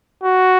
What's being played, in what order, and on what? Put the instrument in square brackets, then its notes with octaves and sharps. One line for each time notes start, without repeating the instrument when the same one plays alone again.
[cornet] F#4